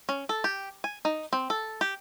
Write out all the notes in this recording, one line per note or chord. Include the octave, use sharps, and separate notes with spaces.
C#4
A4
G4
G#5
D#4
C4
A4
G4